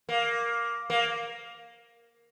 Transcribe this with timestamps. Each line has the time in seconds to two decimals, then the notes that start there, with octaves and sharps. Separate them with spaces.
0.09 A#3
0.90 A#3